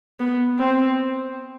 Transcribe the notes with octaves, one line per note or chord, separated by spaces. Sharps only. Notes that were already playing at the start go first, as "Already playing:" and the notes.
B3
C4